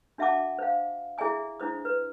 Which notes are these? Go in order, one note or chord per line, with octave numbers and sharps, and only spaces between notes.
D4 F#4 E5 F#5 A5 D6
C5 F5
E4 G#4 D5 E5 G#5 D#6
D4 E4 C5 D#6
B4